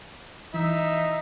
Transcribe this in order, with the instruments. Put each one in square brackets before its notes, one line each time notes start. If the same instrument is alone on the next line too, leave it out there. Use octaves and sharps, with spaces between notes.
[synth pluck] E3 [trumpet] D#4 [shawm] E5